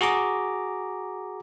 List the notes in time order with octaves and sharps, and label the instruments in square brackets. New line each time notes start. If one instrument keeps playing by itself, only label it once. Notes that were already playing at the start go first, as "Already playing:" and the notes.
[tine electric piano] F#4 G#4 A#5 D6